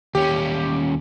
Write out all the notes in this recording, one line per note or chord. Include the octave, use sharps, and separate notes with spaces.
D#2 C#4 G4